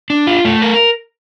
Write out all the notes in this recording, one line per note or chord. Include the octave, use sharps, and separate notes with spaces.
D4
F4
A3
A#4